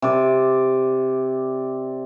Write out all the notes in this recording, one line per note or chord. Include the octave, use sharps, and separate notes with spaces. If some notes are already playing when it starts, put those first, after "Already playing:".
C3 D5